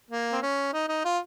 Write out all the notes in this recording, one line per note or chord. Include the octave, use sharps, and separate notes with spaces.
A#3
C4
C#4
D#4
D#4
F4